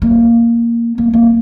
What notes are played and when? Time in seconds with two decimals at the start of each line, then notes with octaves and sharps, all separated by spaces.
0.02 A#3
0.98 A#3
1.13 A#3